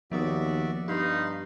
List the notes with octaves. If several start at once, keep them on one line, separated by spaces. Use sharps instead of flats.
D#2 F3 B3 F#4 D5 E5 D#6
G2 D#4 G4 F5 B5 C6